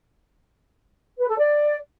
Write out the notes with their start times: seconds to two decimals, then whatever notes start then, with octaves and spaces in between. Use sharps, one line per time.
1.19 B4
1.28 A4
1.38 D5